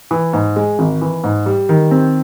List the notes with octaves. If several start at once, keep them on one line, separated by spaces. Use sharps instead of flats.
E3
G#2
G#3
G#1
E3
G#2
G3
D#3
C4